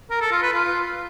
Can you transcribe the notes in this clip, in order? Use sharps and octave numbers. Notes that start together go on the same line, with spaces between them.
A#4
A4
F4
B4
F4